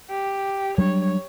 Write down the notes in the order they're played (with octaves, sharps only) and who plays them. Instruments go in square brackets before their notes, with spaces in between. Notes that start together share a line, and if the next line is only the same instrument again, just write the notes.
[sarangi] G4
[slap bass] F#3 G3 D4 [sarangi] C#5